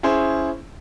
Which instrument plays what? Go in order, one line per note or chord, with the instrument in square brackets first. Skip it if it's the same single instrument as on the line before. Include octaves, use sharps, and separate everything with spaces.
[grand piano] C#4 E4 G#4 C5